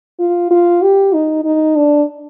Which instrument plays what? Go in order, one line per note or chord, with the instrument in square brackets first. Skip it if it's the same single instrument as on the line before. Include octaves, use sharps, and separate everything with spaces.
[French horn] F4
F4
G4
D#4
D#4
D4